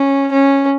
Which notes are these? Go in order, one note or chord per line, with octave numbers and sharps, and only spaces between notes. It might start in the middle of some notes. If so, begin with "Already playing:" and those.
Already playing: C#4
C#4